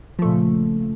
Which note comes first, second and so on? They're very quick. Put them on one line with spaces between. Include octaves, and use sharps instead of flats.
F3 A3 A#2 C#3